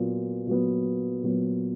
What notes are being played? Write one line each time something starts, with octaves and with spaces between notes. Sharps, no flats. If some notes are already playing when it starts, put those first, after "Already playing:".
Already playing: A#2 F#3 B3
A#2 F#3 B3
A#2 F#3 B3